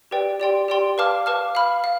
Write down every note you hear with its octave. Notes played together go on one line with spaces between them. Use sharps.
G4 B4 D5 G5
G4 D5 G5 C6
G4 D5 G5 C6
B4 F5 A5 D6 F6
B4 F5 A5 D6 F6
F5 B5 F6
F5